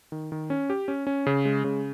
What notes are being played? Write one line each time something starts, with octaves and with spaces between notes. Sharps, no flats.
D#3
D#3
C#4
G4
C#4
C#4
C#3
G#3
C#3